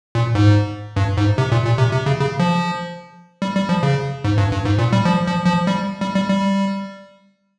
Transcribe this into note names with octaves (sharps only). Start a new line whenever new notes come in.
A#2
G#2
G2
G#2
C3
A#2
A#2
C3
C3
C#3
C#3
F3
G3
G3
F3
C#3
G#2
G2
G2
G#2
A#2
G3
F3
F3
F3
G3
G3
G3
G3